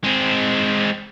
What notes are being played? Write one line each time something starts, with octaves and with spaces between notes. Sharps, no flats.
G#3 C4